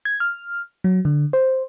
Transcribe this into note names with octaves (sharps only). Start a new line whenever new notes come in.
G#6
F6
F#3
D3
C5